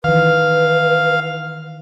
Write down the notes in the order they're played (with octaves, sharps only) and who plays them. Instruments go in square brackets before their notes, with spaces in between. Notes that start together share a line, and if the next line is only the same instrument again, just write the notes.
[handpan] D#3 E3 [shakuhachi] B4 [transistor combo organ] F5